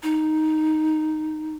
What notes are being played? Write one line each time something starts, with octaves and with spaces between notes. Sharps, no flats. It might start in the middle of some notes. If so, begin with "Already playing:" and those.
D#4